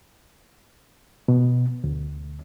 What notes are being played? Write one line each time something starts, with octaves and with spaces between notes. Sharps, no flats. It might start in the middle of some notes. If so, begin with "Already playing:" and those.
B2
D2